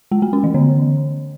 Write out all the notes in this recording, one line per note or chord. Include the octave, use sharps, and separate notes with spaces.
G#3
A3
C#4
E3
D3